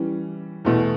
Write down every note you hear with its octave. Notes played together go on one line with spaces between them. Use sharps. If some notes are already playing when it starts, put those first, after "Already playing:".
Already playing: E3 G3 C#4
E2 B2 A3